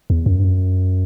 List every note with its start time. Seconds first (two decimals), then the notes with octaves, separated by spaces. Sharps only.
0.10 E2
0.26 F#2
0.39 G2
0.44 F#2